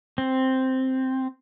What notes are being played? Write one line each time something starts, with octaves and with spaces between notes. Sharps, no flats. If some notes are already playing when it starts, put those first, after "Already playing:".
C4